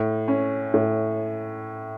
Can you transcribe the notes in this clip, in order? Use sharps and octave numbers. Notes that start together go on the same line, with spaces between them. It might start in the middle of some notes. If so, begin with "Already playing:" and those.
Already playing: A2
C#4
A2